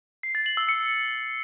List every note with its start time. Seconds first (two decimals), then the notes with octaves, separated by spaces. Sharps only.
0.23 C7
0.35 A6
0.46 F#7
0.57 E6
0.69 C#7